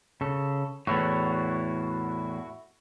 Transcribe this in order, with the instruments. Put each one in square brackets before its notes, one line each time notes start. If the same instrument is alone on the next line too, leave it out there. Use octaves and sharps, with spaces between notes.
[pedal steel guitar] C#3 A4
[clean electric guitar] E2 A2 [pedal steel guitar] E4 F#4